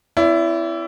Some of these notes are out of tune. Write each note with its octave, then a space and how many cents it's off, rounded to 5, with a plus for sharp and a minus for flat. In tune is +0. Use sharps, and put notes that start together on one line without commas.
C4 -20 E4 +15 D5 -40